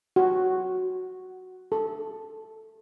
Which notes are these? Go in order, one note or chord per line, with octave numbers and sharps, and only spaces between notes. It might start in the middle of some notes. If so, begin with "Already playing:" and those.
F#4
A4